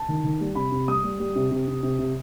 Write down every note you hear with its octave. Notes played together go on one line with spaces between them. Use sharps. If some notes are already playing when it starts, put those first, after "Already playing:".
Already playing: A5
D#3
D#3
G3
C3 B5
C3
G3 D#6
G3
G3
C3
C3
C3
C3
C3